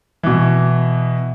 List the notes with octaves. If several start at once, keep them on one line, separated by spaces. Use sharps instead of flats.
B2 E3